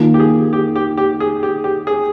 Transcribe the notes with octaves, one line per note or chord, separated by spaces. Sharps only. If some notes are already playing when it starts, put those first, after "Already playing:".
Already playing: D#3 A#3 F4
G4
G#4
G4
G4
G4
G#4
G4
G4
G#4